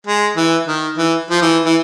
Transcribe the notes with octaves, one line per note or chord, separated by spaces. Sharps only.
G#3
E3
D#3
E3
F3
E3
E3